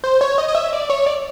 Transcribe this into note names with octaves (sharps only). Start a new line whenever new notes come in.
C5
C#5
D#5
D#5
E5
D5
C#5
D5